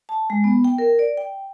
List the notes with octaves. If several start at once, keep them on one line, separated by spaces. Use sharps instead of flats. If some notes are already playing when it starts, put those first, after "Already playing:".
A5
G#3
B3
G5
A#4
D5
G5